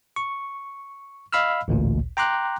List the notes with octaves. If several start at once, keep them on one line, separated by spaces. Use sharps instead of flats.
C#6
D#5 F5 B5 E6 F6
A1 D2 A#2
G5 A#5 C6 D6 F#6